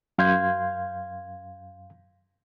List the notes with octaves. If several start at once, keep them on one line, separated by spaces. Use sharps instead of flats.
F#2 F5 C6 G6 G#6